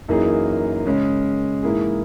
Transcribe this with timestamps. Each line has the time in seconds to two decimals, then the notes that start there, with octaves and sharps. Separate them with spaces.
0.09 F#2 E3 A#3 D#4 G#4
0.86 C#3 G#3 C#4
1.63 G#2 E3 A#3 E4 G#4